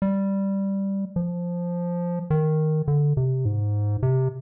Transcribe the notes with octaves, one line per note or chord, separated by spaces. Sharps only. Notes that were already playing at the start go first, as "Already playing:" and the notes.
G3
F3
D#3
D3
C3
G#2
C3